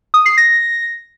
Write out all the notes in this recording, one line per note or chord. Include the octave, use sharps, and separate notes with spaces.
D#6
C7
A#6